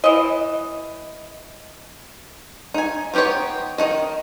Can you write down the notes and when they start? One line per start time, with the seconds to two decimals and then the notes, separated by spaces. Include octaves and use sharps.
0.04 E3 D#5
2.74 D#4 G#5
3.14 B3 D#4 G4 C5 C#5
3.78 D#3 D#4 D#5